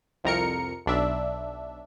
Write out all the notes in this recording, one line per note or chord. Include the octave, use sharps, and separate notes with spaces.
C2 F2 A#4 C#7
B1 D4 E5